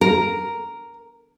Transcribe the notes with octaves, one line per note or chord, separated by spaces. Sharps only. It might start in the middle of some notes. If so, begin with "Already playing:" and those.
A#4